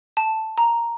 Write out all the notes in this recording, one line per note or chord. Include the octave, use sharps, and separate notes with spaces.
A5
A#5